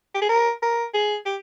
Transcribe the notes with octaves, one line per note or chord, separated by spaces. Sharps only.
G4
G#4
A#4
A#4
G#4
G4